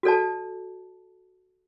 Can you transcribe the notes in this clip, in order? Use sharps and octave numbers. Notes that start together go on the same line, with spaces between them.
F#4 A4 D5 A5